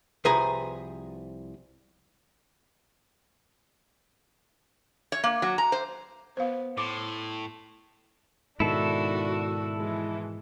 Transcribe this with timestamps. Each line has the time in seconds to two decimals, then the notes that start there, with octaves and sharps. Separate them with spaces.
0.25 C2 F3 G#4 B4 G#5 A#5
5.12 C#5
5.24 A#3
5.42 F#3
5.58 A#5
5.72 C5
6.37 B3 C5 F5
6.78 A2 C6 D6
8.60 G#2 B2 D#3 D4 E4 F#4 A4
9.78 E3 G#3